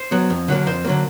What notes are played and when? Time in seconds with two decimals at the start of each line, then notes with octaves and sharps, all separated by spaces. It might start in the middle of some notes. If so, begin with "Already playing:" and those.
Already playing: C5
0.11 F#3 B3
0.30 F2
0.48 D3 F#3 A#3
0.66 F2 C5
0.85 D3 F#3 A#3